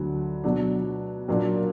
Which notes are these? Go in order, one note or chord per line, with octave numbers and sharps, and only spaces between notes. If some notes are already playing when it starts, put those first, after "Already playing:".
Already playing: D2 D3 F#3 D4
B2 F#3 D4
A#2 F#3 A#3 D4